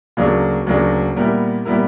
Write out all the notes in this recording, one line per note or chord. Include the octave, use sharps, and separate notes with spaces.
D2 C#3 F#3 A#3 D4
D2 C#3 F#3 A#3 D4
A#2 G3 B3 E4 A#4
A#2 G3 B3 E4 A#4